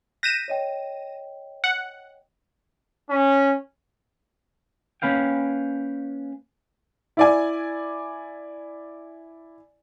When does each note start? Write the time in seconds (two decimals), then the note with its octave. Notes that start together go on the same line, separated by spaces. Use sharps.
0.23 F#6 G6 A#6 B6 D#7 E7
0.48 C#5 D#5 G5
1.64 F#5
3.10 C#4
5.02 A#3 C#4 B4 F5 G5
7.17 E4 D5 G#5